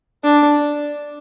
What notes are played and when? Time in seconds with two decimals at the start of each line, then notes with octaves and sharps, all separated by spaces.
0.23 D4